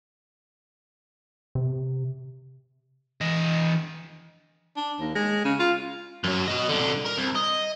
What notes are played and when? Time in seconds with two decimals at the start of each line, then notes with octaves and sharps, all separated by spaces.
1.55 C3
3.21 E3 D#5
4.76 D4
4.99 D#2
5.15 G#3
5.45 C#3
5.59 F4
6.24 F#2 F#3
6.48 F#4 D#5
6.69 C2 D3
7.06 A#4
7.19 C2
7.36 D#5